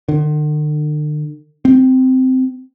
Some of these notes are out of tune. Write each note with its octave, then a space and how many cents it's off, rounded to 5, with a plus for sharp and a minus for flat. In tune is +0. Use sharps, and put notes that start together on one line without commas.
D3 +45
C4 -15